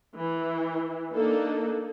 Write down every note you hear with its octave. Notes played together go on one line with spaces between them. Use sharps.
E3
A#3 D4 D#4 A4